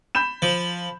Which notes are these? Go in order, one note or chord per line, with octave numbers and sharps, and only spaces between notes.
B5 G6 E7
F3